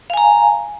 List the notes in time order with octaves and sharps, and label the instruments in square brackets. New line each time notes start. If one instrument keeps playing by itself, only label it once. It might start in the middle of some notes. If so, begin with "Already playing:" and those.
[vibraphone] F5
G#5
A#5